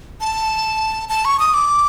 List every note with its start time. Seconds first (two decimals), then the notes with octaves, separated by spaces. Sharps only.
0.21 A5
1.09 A5
1.25 C#6
1.39 D#6
1.54 D6